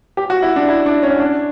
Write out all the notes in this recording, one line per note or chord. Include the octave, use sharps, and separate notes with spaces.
G4
F#4
E4
D4
E4
D4
C#4
D4